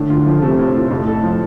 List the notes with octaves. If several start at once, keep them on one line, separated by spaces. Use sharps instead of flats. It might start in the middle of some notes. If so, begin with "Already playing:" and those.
Already playing: A2 D3 D4
F4
F3
C3 A3
A2
F4
F2 A2
A4
F3